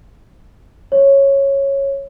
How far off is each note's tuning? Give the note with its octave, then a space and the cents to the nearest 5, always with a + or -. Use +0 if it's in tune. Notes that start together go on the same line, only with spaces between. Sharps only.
C#5 -10